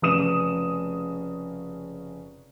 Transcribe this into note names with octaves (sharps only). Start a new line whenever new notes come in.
F1 C#3 D#6 E7